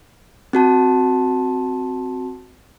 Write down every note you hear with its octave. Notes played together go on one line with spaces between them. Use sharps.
C4 F#4 A5